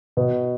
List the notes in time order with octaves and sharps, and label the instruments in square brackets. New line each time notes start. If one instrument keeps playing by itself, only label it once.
[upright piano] B2